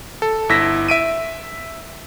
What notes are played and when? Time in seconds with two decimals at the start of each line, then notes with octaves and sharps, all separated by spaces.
0.22 A4
0.49 G1 E4 E6 A#6 B6
0.88 E5 D7 D#7